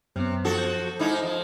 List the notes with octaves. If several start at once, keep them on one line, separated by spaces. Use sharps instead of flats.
F#2 C3 B3
F3 F#4 A4
G6
G#2 D#4 E4
F3